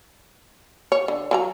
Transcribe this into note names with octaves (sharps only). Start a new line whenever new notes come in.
C#5
D3
F#3 A#4 A#5